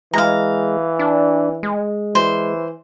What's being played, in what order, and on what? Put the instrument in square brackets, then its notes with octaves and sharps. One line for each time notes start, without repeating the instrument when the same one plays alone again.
[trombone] E3 [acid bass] G#3 [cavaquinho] F5 A#5
[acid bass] D4
G#3
[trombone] E3 [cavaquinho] C5